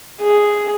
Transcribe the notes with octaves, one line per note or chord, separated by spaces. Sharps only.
G#4